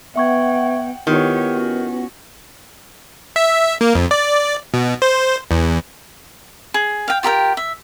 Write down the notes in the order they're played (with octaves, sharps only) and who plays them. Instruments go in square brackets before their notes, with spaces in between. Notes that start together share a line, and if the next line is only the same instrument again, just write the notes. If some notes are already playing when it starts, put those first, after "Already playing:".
[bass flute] B3 [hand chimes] E5 C#6 G#6 [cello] F#5 G5
[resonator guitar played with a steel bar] D#3 [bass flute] B3 [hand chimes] E4 F4 [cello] G4 C#5
[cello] C#4 F#4
[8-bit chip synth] E5
A#3
F2
D5
B2
C5
E2
[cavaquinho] G#4
F5 G5
F4 G4 A#4 G5
E5